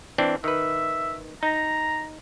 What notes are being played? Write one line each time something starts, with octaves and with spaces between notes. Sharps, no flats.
E3 C4 D4
D#3 B4 E5
D#4 A#5